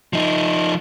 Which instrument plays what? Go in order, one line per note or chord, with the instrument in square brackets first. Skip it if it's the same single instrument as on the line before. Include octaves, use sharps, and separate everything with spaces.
[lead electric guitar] F3 D#4